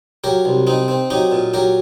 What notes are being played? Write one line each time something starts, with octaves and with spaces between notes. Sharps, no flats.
F#3 G4 A#4
C2
C4 D#4
C4
F#3 D#4 G4
A#2
F#3 G4 A#4